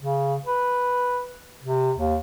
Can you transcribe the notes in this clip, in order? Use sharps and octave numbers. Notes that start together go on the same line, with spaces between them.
C#3
B4
C3
D#2